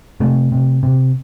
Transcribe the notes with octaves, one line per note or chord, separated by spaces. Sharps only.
C3 A3
C3
C3